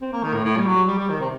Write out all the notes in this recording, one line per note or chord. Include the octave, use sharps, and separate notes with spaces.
C4
A#3
D#3
A2
A2
G3
F#3
G3
G3
D#3
C3